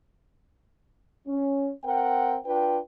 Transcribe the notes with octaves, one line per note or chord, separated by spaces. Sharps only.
C#4
C4 A#4 F#5 G5
D4 F4 B4 G5